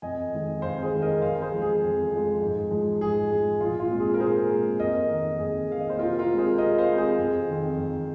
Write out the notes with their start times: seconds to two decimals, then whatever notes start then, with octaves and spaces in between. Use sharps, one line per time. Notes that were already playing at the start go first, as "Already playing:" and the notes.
0.02 F2 D#5 G#5
0.33 D#3 G#3 C4
0.62 F2 C5 F5
0.82 G#4 C5
0.92 D#3 G#3 C4
1.02 A#4 D#5
1.21 F2 C5 F5
1.41 G#4 C5
1.52 F3 G#3
1.62 G#4
1.82 F2
2.11 F3 G#3
2.42 G#2
2.71 F3 G#3
3.01 G#2 G#4
3.31 F3 G#3
3.60 A#2 F4
3.80 F4
3.90 G#3 C4
3.99 G#4
4.14 A#4
4.20 A#2 G#4 C5
4.50 G#3 C4
4.79 F2 A#4 D#5
5.10 D#3 A#3
5.39 F2 G#4
5.69 D#3 A#3 F5
5.80 D#5
5.90 C5
5.98 C3 F4 A#4
6.18 F4 A#4
6.29 G#3 C4
6.38 G#4 C5
6.58 C3 A#4 D#5
6.78 C5 F5
6.88 G#3 C4
6.98 G#4 C5
7.18 F2
7.48 D#3 C4
7.77 F2